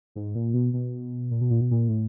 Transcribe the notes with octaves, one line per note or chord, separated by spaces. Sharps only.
G#2
A#2
B2
B2
A#2
B2
A#2
B2
A#2
A2